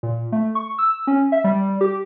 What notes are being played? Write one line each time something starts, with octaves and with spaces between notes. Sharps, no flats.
A#2
A3
C#6
E6
C#4
E5
G3
G3
G4